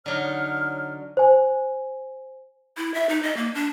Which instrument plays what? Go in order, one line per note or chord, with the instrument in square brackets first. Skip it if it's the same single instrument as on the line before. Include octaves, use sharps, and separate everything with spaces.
[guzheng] D3 F#3 D#4 [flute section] C#5 F6
[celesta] C5 G#5
[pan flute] E4
E5
D#4
D#5
A#3
D4